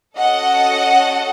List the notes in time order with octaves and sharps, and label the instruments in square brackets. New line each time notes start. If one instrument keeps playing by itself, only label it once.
[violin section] C#4 F#4 A4 D#5 F#5